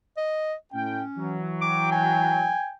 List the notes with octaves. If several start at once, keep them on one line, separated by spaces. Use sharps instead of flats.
D#5
A2 C#4 G5
E3 F#3
G5 D6
G#5